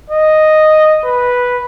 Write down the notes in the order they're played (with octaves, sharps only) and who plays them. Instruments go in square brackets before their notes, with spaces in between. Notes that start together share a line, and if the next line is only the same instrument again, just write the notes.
[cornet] D#5
B4